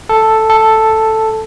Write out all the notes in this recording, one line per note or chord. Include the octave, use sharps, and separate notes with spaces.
A4
A4